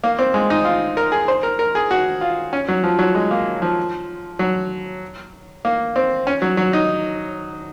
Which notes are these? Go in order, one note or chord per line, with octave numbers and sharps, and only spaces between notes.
A#3
C4
G#3
D#4
F4
A#4
G#4
C5
A#4
A#4
G#4
F#4
F4
C#4
F#3
F3
F#3
G#3
A#3
F3
F#3
A#3
C4
C#4
F#3
F#3
D#4